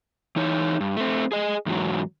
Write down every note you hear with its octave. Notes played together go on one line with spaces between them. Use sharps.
E3 D#4 C#5
G2
A3 C4
G#4 D#5
E2 G#2 F#3